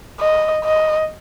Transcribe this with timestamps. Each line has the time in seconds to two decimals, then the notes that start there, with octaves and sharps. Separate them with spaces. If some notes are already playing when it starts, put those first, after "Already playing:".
0.20 D#5
0.64 D#5